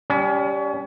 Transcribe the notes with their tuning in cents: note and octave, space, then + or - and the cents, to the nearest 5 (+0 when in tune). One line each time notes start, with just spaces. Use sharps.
G3 +0 C#4 +30